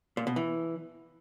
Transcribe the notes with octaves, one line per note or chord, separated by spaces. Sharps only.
A#2
B2
E3